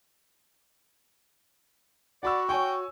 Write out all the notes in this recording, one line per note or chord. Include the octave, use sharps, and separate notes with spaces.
F#4 D5 F#5 B5 E6
C#5 G5 G#5 C#6